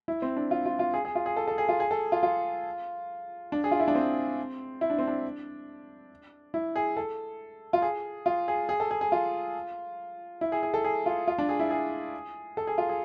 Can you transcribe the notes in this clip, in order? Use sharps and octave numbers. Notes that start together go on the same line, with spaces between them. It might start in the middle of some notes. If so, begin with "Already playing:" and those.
E4
C4
D4
F4
F4
F4
G#4
G#4
F4
G#4
A4
A4
G#4
F4
G#4
A4
F4
F4
D4
G#4
F4
E4
D4
C4
E4
D4
C4
D4
E4
G#4
A4
F4
G#4
F4
G#4
G#4
A4
G#4
G#4
F4
E4
G#4
G#4
A4
G#4
F4
F4
D4
G#4
E4
G#4
A4
G#4
F4
G#4